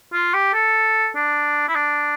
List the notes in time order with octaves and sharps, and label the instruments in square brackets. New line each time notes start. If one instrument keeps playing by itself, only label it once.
[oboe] F4
G4
A4
D4
E4
D4